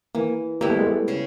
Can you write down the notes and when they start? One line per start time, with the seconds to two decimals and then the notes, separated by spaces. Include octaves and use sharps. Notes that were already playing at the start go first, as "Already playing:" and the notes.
0.15 E3 A#3
0.61 G3 A#3 B3 E4
0.70 A3
0.79 G#3
0.87 A3
1.08 C#3